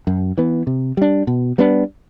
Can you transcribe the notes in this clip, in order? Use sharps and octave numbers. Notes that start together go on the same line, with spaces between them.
F#2
E3 B3
C3
G3 D4
B2
G3 B3 D4